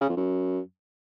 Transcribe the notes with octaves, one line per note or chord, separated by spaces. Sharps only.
C#3
F2
F#2